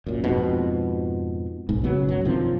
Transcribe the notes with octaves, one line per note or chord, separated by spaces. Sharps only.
F#2 A#2
F2 G#2 B2
B1 G#2
C#3 F#3 B3
A#1 F#2 F#3
G2 C3 D#3 F3